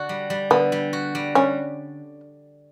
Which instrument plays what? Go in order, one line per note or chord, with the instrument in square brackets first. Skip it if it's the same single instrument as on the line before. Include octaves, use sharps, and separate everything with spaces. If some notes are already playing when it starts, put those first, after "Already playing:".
Already playing: [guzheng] D3 D4 F#4
G3
G3
[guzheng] D3 [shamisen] B3
[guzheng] G3
F#4
G3
[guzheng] G3 [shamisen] C#4